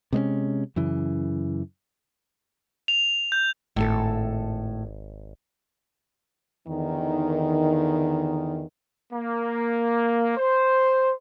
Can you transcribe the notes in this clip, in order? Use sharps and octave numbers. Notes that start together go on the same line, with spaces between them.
C3 G#3 B3 C#4
F#2 C#3 E3
F7
G6
G#1 A2 A4
E2 D3 D#3
A#3
C5